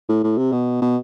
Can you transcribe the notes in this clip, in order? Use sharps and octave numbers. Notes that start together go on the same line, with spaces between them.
A2
A2
C3
B2
B2